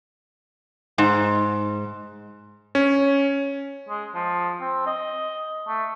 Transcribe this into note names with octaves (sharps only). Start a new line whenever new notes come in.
G#2
C#4
G#3
F3
C4
D#5
A3